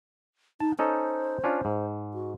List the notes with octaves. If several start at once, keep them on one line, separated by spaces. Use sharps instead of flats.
D#4 A5
C#4 D#4 A4 C5
C#4 D4 F4
G#2
F#4